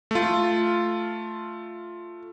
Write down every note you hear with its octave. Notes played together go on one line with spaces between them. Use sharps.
A3 F4